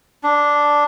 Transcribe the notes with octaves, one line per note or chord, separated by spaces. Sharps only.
D4